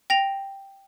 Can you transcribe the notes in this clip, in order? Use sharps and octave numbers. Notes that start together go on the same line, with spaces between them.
G5 A#6 F7